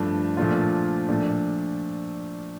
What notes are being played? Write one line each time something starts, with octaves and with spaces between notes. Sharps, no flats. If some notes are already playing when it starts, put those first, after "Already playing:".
Already playing: G2 F3 A3 D4
A#2 F3 A3 D4 F4
A#2 F3 A3 D4